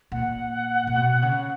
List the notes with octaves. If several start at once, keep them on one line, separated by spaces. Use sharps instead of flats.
A#2 F#5
A#2
B2
C#3